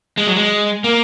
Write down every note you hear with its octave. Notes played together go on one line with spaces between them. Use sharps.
G#3
F#3
G#3
A#3